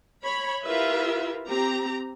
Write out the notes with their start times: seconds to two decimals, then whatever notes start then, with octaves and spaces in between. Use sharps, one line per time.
0.23 C#5 B5
0.63 E4 F4 G4 A#4 B4 E5
1.47 C4 G4 A#5